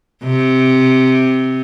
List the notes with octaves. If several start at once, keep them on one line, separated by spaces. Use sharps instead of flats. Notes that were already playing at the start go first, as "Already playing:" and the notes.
C3